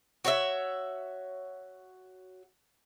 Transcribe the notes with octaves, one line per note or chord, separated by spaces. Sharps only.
F#4 C#5 D5 E5